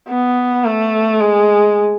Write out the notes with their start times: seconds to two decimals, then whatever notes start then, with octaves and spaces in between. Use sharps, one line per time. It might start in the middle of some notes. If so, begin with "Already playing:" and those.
0.09 B3
0.65 A3
1.20 G#3